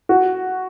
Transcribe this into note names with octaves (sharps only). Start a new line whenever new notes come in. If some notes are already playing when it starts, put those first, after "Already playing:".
F#4